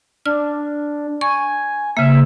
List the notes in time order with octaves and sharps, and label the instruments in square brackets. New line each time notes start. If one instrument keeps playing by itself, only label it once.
[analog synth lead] D4 [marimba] F6
[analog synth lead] G#5 [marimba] C#6
[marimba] C#3 A#3 [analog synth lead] E5